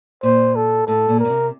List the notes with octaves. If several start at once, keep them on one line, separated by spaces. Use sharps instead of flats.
A#2 C5
A4
A2 A4
A#2
A#4
A#2
C3